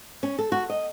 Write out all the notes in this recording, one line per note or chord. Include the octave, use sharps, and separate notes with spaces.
C#4
A4
F#4
D#5